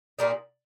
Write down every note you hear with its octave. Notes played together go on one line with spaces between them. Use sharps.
A#2 G3 A#3 D#4